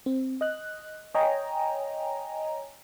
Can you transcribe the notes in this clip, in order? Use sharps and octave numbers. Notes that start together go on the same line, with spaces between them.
C4
D#5 F#6
C#5 D#5 G5 G#5 A#5